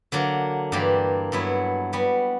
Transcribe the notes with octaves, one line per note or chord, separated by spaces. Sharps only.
D3 F#3 A#3 D4
G2 E3 A#3 D4 G4
G2 F#3 B3 E4
G3 B3 F#4